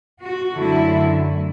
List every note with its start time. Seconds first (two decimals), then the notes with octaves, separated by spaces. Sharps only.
0.20 F#4
0.57 F#2 D3 F#3 A3 E4